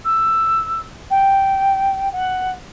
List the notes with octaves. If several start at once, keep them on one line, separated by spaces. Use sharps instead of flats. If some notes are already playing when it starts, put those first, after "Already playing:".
E6
G5
F#5